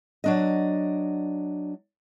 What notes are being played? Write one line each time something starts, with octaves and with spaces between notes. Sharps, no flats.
F#3 D4 D#5